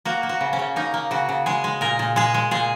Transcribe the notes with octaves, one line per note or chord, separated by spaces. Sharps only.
A#3 F#4
A#3
F#4
C#3
C#4
C#3
A#3 D#4
A#3
C#3 F#4
C#3
G#3 G#4
G#3
A#2 A#4
A#2
G#3 G#4
G#3
A#2 G#4